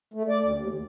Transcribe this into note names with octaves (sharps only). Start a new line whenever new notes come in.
A3
D5
D2
D#2
E2